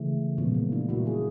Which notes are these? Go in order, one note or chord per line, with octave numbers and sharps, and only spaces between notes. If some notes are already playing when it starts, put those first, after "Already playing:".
Already playing: C#3 E3 A3
A#2 F3 G#3 B3
A#3
D4 E4
A#2 G3 A#3 E4 F#4
F#4 G#4